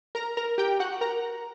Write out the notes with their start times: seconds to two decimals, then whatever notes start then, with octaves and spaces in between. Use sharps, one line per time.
0.15 A#4 A#5
0.37 A#4 A#5
0.58 G4 G5
0.80 F#4 F#5
1.01 A#4 A#5